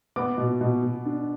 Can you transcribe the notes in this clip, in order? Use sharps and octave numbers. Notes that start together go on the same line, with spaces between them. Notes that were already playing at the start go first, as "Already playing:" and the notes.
B3 D6
B2
B2
B2
D4